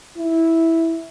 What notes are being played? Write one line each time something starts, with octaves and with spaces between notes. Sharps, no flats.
E4